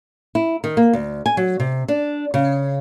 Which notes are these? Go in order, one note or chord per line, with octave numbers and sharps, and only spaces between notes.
E4
D#3
A#3
D2
G#5
F#3
C3
D4
C#3